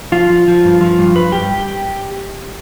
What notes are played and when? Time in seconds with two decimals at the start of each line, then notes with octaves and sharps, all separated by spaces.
0.12 F3 F4
0.30 F3
0.48 F3
0.65 G2
0.81 F3
0.98 G2
1.15 G2 B4
1.32 G2 G4